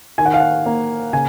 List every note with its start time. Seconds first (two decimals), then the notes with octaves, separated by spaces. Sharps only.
0.18 D#3 G#5
0.25 F#5
0.34 F5
0.40 F#5
0.66 A#3
1.13 C#3 G#5